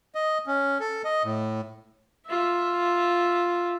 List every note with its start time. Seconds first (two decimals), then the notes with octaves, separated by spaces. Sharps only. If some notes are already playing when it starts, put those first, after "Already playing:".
0.15 D#5
0.47 C#4
0.80 A4
1.05 D#5
1.23 A2
2.27 F4 E5